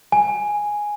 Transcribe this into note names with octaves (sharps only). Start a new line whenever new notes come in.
G#5